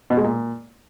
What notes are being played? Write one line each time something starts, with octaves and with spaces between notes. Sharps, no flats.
B2
G#3
A#2